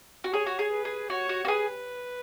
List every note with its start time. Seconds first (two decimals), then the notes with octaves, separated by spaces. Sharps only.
0.24 F#4
0.32 G#4 C#5
0.46 F#4
0.59 G#4
0.72 B4
0.85 G#4
1.10 F#4 C#5
1.29 F#4
1.45 F#4
1.48 G#4 B4